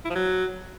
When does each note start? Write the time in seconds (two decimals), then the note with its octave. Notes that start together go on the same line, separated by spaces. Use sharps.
0.05 E4
0.10 F3
0.15 F#3